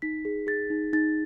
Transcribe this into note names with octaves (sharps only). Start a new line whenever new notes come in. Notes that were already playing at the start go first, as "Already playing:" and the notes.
D#4 B6
G#4
G#4 A6
D#4
D#4 A6